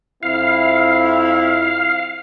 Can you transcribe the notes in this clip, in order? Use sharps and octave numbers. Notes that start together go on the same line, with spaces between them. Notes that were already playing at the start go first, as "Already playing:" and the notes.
F2 C4 E4 F5